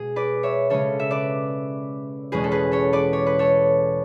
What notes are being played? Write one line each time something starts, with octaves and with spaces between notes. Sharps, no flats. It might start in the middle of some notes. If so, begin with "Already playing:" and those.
Already playing: B2 G#3 G#4
B4 D5
C#5 E5
C#3 G#3 C#4 A4 C#5
E5
B4 D5
E2 B2 G#3 C#4 G#4 B4
A4
G#4 B4
A4 C#5
B4 D5
C#5
B4
A4 C#5